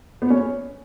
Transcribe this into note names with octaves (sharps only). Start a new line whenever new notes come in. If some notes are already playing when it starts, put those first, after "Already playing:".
B3
C#4